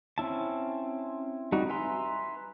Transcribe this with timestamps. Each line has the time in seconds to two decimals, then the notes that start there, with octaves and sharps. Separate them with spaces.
0.18 C4 C#4 E4 A5
1.52 G3 D#4 F#4
1.69 B4 E5 G#5 A#5 C6